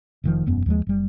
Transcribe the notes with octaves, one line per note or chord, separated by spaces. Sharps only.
F1 D#3 F3
E1 F#2 B3
D#2 F3 G#3
F#1 G3